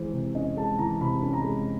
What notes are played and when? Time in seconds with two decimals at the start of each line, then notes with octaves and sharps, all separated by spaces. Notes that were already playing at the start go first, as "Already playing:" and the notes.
Already playing: E3 G#3 C5
0.13 C3
0.35 C#4 D#5
0.57 G#3 A5
0.79 E3 A#5
0.91 A#5
1.01 C3 B5
1.23 C#4
1.33 A#5
1.44 G#3